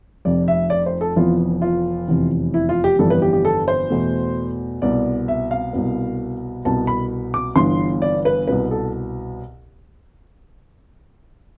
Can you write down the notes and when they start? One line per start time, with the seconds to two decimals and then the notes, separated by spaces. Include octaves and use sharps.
0.25 F1 F2 C3 D5
0.48 E5
0.70 D5
0.86 C5
1.01 A4
1.16 F1 F2 E3 B3 F4
1.62 F4
2.08 F1 E2 C3 E3
2.54 E4
2.69 F4
2.84 G4
2.99 G1 F2 E3 G3 B3 A4
3.10 B4
3.22 G4
3.33 G4
3.45 A4
3.68 C5
3.90 E2 B2 A3
4.82 C2 B2 B3 D5
5.28 E5
5.51 F5
5.73 C2 B2 B3
6.65 C2 B2 B3 A5
6.87 B5
7.34 D6
7.56 G1 G2 E3 B3 C6
8.02 D5
8.25 B4
8.47 C2 B2 B3 B4
8.71 A4